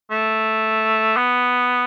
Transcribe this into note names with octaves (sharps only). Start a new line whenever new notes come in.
A3
B3